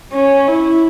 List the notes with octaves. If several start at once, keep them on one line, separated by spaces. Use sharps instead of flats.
C#4
E4